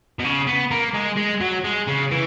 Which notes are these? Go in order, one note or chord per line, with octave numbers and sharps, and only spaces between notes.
B2
C#3
B3
A#3
G#3
G#3
F#3
G#3
C#3
E3